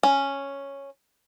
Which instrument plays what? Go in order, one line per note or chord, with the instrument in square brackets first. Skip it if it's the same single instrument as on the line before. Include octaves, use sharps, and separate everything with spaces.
[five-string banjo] C#4